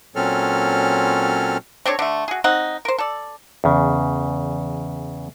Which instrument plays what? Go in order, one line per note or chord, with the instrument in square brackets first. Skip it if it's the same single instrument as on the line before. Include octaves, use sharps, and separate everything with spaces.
[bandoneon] A#2 F#3 C4 C#4 A4 F6
[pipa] C4 D4 A4 C#5
D3 A3
F#4 G#4
C4 D#4 F#5
A#4 C5
A4 D5
[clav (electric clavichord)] E2 C#3